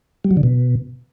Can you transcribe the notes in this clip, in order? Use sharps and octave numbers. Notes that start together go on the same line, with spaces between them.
G3
F#3
D3
B2